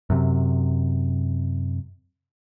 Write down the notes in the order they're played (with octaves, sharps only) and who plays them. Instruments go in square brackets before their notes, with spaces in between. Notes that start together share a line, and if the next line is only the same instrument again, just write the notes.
[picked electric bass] F#2 C3